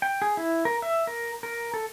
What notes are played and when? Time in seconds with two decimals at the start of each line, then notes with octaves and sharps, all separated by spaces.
0.02 G5
0.22 G#4
0.37 E4
0.65 A#4
0.82 E5
1.07 A#4
1.43 A#4
1.74 A4